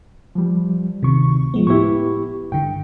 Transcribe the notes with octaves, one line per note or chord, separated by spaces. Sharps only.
F3 G3
D2 C3 D#3 C#6
F3 G#3 B3
A2 B3 E4 G4 C#6
G2 D3 G5